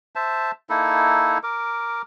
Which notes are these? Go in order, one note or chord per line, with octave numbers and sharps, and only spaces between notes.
C5 E5 A5
A#3 D#4 E4 A4
A#4 D6